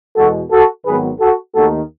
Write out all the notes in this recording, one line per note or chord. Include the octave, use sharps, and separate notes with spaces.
E2 B2 G#3 F#4 A4
F#4 A4
G#1 G#2 D#3 F#3 B3 G#4 B4
F#4 A4
D#2 D#3 A3 F#4 A4